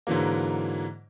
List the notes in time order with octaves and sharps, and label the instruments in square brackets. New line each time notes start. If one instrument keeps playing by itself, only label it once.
[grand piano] G#2 D3 E3 F#3 A#3